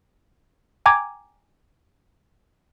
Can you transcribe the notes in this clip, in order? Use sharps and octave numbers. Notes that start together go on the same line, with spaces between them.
G5 G#5 A#5 D6 G#6